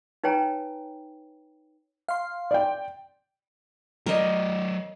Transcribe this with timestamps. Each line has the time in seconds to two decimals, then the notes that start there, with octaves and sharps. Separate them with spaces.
0.24 D#4 B4 C#5 G5 G#5 A#5
2.09 F5 C6
2.51 D5 G5
4.06 F#3 A#4 D5 D#5